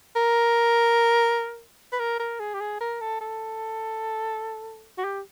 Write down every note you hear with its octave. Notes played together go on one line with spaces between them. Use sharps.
A#4
B4
A#4
A#4
G#4
G4
G#4
A#4
A4
A4
F#4
G4